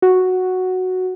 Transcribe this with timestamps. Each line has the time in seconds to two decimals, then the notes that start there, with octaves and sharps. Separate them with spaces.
0.02 F#4